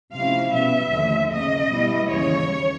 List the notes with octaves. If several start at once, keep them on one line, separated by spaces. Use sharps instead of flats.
C3 F3 A3 C#4 E4 F5
B2 G3 B3 E5
D#2 D3 F3 A3
C#3 F3 A#3 D#5
B2 G3 B3 E4
D#2 C#3 E3 G3 C#5